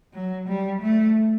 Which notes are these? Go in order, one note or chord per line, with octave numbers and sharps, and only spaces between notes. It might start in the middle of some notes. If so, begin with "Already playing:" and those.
F#3
G3
A3